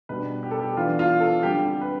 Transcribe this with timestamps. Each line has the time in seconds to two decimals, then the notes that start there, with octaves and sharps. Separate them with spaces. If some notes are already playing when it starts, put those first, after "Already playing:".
0.09 B2 G3 B3 D4 B4
0.43 G4
0.51 A4
0.59 G4
0.77 E3 B3 D4 F4
0.99 F4
1.20 A4
1.43 D3 G3 C4 G4
1.65 G4
1.81 B4